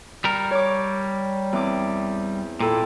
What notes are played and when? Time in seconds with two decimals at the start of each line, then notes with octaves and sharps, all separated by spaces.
0.24 G3 A#4
0.51 C#5 C#6 D6
1.52 E2 C4 D6
2.60 A#2 E4 A4 G5